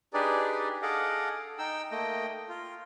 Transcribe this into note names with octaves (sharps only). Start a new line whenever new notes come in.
D4 D#4 G4 G#4 B4 D5
G#4 A4 D#5 F5 F#5 D6
D#4 G5 E6
A3 A#3 D#5 G5
F4